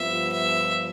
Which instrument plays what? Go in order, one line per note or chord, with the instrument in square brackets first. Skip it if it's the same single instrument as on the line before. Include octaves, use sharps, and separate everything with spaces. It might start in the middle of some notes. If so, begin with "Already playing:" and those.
Already playing: [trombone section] G2 F3 B3 F4 [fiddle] E5
[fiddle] E5